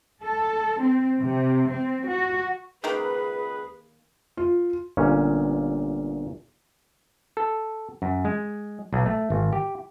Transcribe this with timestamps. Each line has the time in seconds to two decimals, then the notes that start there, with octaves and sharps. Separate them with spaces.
0.21 A4
0.82 C4
1.18 C3
1.71 C4
2.08 F#4
2.84 C#2 D#3 A#3 G#4 B4
4.37 F4
4.97 G1 A#2 C#4
7.37 A4
8.02 F#2
8.25 G#3
8.93 B1
9.06 A3
9.30 G#1
9.53 G4